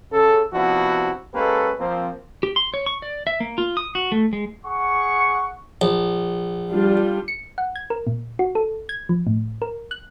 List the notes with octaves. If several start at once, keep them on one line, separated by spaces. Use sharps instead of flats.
C#3 A4
C3 F3 B3 D4 E4 F#4
G#3 A#3 C#4 G4 A4 B4
F3 A#3 C4
G4
C6
C#5
C#6
D5
E5
A#3
F4
D#6
F#4
A3
G#3
G#4 F#5 C#6
A#1
G3 D4 F4
C#7
F#5
G#6
A#4
A#2
F#4
A4
G#6
F3
A2
A#4
F#6